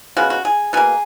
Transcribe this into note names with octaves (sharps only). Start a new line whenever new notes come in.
C#3 G#3 B3 F#4
F#4
G#4
B2 A#3 G#4